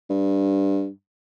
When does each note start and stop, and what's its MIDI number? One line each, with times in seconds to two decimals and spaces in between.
0.10 0.89 43